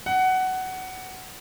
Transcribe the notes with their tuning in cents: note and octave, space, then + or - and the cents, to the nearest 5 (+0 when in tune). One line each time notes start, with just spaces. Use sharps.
F#5 +15